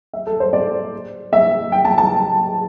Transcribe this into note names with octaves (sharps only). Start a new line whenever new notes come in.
E5
A4
C5
D5
E5
G5
A5
A5